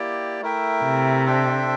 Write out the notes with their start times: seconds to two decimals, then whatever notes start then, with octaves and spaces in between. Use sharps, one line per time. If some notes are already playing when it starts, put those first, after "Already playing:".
Already playing: A#3 E4 G4 D5 G5
0.42 A3 E4 A#4 E5 G5
0.84 C3
1.26 D4 A4 C5 E5 G5